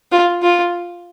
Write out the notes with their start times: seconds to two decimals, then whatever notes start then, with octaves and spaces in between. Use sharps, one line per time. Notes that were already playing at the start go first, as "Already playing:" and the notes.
0.12 F4
0.42 F4